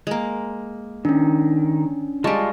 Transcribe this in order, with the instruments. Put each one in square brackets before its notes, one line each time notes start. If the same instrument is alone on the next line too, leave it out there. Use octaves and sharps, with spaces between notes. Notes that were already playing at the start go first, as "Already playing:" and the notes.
[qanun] G#3 A#3
[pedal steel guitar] D#3 [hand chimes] C#4 D4
[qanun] G3 G#3 [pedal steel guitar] F4 A5 C#6